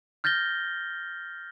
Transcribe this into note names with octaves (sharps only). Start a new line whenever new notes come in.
F6 G6 A6 A#6 G7